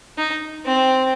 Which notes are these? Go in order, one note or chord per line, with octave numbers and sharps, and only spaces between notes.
D#4
C4